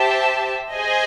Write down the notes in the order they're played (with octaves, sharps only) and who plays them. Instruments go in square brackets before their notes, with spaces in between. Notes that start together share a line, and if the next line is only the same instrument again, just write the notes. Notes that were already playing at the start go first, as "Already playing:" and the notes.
Already playing: [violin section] G4 C5 E5 A5
G#4 C5 D#5 G#5